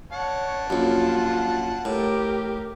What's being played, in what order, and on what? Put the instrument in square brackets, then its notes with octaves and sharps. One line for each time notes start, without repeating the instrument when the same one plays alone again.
[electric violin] C#5 [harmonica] F#5 A5
[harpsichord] A#1 F#2 [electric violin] F4
[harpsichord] A2 [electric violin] G4 A#4